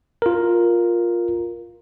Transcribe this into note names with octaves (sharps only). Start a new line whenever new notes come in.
F4 A#4